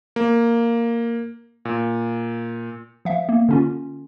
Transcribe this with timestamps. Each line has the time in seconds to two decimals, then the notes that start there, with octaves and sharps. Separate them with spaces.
0.16 A#3
1.65 A#2
3.05 F3 E5 F5
3.29 A#3
3.49 D3 C#4 F4